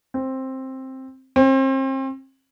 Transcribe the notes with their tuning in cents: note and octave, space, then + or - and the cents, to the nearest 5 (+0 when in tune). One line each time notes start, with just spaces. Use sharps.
C4 +10
C4 +35